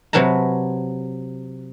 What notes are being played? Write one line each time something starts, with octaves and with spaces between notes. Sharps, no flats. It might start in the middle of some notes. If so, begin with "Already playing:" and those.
C3 F#3 B4 A5 A#5